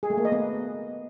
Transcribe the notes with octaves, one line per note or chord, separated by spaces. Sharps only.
G#4
A3
A#3
D#5
B3